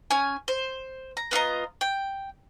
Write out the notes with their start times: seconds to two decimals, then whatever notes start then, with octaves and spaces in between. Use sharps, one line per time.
0.11 C#4 G#5
0.48 C5
1.17 A#5
1.31 B3 F4 D#5 A#5
1.81 G5